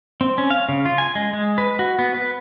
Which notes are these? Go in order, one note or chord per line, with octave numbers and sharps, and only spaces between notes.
C4
C#4
F5
C#3
F4
G#5
G#3
G#3
B4
F#4
B3
B4